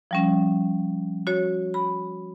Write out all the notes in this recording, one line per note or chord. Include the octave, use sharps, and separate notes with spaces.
F3 G3 C#4
F#4 C#5
B5